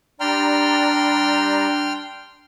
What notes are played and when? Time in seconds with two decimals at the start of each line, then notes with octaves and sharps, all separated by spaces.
0.20 G3 D4 D5 G5 A#5 C6 F6